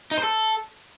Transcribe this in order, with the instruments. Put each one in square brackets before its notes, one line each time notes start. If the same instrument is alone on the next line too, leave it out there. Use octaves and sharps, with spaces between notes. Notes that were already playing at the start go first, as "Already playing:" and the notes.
[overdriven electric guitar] D#4
C5
A4